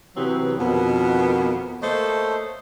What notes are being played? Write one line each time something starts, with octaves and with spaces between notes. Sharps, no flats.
C3 E3 F#3 B3 C4 G4
F2 B2 D#3 A#3 B3
A3 A#3 A4 C5 C#5 D#5